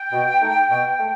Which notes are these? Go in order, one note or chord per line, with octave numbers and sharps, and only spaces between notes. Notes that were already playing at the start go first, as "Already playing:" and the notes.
Already playing: G5
B2
A3 D#4
B2
A3